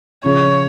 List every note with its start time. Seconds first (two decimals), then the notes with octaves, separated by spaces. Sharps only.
0.24 C#3 F3 C#4 C#5